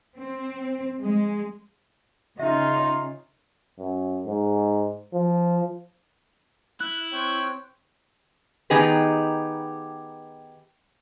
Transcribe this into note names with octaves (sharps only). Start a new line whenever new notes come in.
C4
G#3
C#3 D#4 F4 E5
F#2
G#2
F3
E4 F#6
C4 C#5 G5
D#3 B3 D#4 G4 G#4 B4